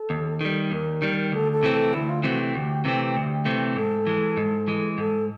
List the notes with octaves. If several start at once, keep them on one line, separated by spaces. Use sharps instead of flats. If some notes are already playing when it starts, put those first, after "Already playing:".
Already playing: A4
D#2
D#3 G3
D#2 A#4
D#3 G3
D2 A4
A4
C3 E3 A3 C4
A4
D2 E4
F4
C3 E3 A3 C4 F#4
G4
D2
C3 E3 A3 C4
D2
C3 E3 A3 C4
G#2 A4
E3 G#3
G#2
E3 G#3
G#2 A4